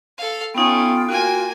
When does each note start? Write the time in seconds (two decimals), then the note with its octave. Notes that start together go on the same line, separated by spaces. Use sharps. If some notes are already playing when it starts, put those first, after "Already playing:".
0.18 A4 F5
0.55 A3 B3 C#4 D#4 F4 G5
1.09 A#3 F#4 G#5